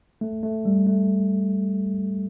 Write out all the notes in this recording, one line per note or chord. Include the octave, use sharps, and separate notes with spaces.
A3
A3
G3
A3